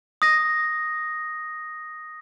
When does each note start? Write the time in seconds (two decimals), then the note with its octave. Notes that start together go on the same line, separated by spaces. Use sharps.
0.22 D#6 A#6